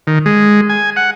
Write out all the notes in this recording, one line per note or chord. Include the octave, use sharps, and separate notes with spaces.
D#3
G#3
G#5
F#5